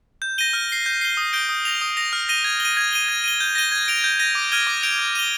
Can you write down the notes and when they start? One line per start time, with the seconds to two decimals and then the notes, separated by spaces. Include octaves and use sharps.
0.22 G6
0.38 A#6 D#7 G7
0.53 F6
0.69 C7 G7
0.86 G6
1.01 C7 G7
1.17 D#6
1.33 G6 D7 G7
1.49 D#6
1.65 A#6 F7
1.82 D#6
1.97 A#6 F7
2.13 F6
2.29 A#6 D#7 G7
2.44 G#6
2.60 G7
2.65 D#7
2.77 G#6
2.93 D#7 G7
3.09 G#6
3.24 D#7 G7
3.40 G6
3.55 A#6 D#7 G7
3.72 G#6
3.88 D7 F7
4.04 G6
4.20 A#6 D#7
4.35 D6
4.52 F6 G#6 D#7 G7
4.67 D6
4.83 G6 D7 F7
4.99 G#6
5.15 D#7 G7